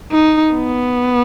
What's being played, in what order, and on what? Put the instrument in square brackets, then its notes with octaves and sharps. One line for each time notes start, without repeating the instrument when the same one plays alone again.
[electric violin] D#4
B3